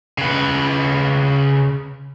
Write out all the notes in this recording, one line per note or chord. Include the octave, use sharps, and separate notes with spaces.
C#3 B4